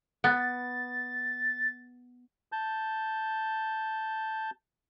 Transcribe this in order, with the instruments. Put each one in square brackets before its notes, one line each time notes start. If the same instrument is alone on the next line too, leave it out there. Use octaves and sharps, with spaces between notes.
[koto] B3 [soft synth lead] A6
[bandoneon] A5 G6